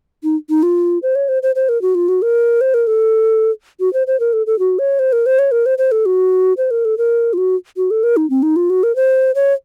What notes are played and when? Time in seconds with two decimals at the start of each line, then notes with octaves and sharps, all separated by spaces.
0.23 D#4
0.50 D#4
0.63 F4
1.03 C5
1.15 C#5
1.29 C5
1.43 C5
1.55 C5
1.69 A#4
1.82 F#4
1.95 F4
2.09 F#4
2.22 A#4
2.61 C5
2.74 A#4
2.87 A4
3.80 F#4
3.93 C5
4.07 C5
4.20 A#4
4.33 A4
4.47 A4
4.59 F#4
4.79 C#5
4.99 C5
5.13 A#4
5.26 C5
5.39 C#5
5.52 A#4
5.66 C5
5.78 C5
5.92 A4
6.06 F#4
6.57 C5
6.71 A#4
6.85 A4
6.98 A#4
7.33 F4
7.38 F#4
7.77 F#4
7.91 A4
8.03 A#4
8.17 D#4
8.30 C4
8.43 D#4
8.56 F4
8.70 F#4
8.83 A#4
8.96 C5
9.35 C#5